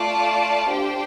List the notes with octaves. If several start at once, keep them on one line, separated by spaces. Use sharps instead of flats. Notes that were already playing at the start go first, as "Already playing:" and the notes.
Already playing: A3 F4 D5 A5
D4 G4 C5 G5